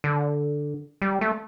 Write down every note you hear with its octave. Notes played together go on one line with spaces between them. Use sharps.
D3
G3
A3